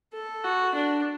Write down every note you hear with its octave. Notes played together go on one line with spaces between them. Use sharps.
A4
F#4
D4